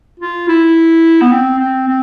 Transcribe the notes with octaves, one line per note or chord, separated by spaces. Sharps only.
F4
E4
B3
C4
C4
C4